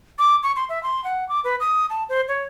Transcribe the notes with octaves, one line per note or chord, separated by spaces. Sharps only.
D6
C#6
C6
E5
C6
F#5
D6
B4
D#6
A5
C5
C#5